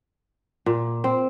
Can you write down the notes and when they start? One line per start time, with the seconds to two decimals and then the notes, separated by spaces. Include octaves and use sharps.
0.66 A#2
1.04 C4